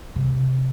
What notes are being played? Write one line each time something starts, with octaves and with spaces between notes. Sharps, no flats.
C3